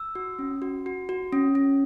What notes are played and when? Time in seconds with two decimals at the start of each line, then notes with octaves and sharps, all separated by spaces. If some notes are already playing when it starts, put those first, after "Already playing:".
Already playing: E6
0.15 F#4
0.39 C#4
0.62 F#4
0.86 F#4
1.09 F#4
1.33 C#4
1.55 C#4